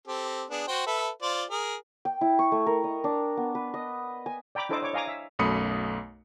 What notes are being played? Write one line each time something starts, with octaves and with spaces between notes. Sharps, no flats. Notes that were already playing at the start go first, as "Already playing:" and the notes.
C4 G4 A4
B3 D4 G#4
F#4 C5 G5
A4 B4 E5
F4 C5 D5
G#4 A#4
G5
E4
C#6
A3
A#4
D#5
D4
B3
B4
D#5
G#5
D5 G5 A#5 B5 D6
D4 E4 A4 C5 D#5 D6
C#5 D6
D#5 F5 G#5 A#5 D6
E5
B1 F#2 A3 B5 D#6 C#7